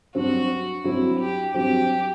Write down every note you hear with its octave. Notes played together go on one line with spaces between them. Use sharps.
G2 F#3 C4 F#4
G2 F#3 C4 E4
G4
G2 F#3 C4 G4